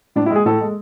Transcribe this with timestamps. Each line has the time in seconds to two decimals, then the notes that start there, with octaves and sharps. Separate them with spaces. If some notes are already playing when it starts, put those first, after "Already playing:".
0.16 A2 D4
0.26 E4
0.30 G#3
0.36 G#4
0.46 A2 A4
0.61 G#3